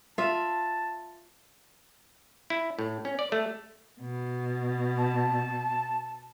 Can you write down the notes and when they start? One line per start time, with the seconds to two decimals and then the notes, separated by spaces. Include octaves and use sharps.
0.18 F4 E5 A5
2.50 E4
2.79 A2
3.05 C#4
3.19 D5
3.32 A3
4.01 B2
4.98 A5